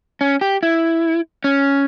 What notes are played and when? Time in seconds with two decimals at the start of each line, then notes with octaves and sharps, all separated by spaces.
0.21 C#4
0.41 G4
0.63 E4
1.44 C#4